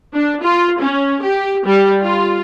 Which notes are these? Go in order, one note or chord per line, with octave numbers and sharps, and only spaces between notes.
D4
F4
C#4
G4
G3
F4